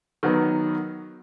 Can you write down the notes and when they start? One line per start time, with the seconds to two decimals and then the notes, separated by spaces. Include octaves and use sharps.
0.23 D#3 F#3 B3